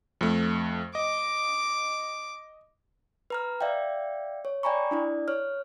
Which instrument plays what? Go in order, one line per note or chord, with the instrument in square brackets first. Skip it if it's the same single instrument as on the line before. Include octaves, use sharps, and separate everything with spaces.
[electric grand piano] F2 A3
[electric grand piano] D#5 [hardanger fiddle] D6
[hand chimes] B4 A#5 F6
D5 E5 F5 G5
C#5
D5 G5 G#5 A#5 B5 C#6
D4 E4 D5
C#5 F6